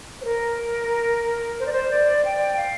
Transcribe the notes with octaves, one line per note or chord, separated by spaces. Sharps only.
C5
A#4
C5
D5
C5
D5
G5
F5